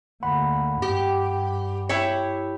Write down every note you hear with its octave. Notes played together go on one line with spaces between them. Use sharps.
D2 A#3 F#5 B5 C6
G2 G4
E4 G4 C#5